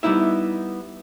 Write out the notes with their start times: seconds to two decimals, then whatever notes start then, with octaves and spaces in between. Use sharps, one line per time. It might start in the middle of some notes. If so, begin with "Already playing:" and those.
0.03 G3 B3 D#4 E4 E5